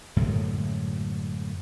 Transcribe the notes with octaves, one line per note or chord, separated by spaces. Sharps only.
F#2 A2 D3 G#3